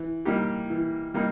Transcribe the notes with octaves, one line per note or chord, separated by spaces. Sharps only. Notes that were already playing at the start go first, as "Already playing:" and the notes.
Already playing: E3
G3 A#3 D#4 G4
E3
G3 A#3 D#4